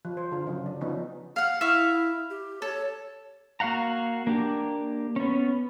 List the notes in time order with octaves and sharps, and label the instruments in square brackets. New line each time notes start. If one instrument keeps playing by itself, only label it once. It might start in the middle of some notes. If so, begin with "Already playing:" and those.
[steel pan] F3
C5
D3 F4
C#3 F#3
D4
F3 B3 C#4 D#4
[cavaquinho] F5 F#5
[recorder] E4 [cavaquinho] E5 F5 C#6
[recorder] G4
[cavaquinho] A4 [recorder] C#5
[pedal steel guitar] A#3 F#4 F5 F#5 A#5
A#3 D4 G4
B3 C#4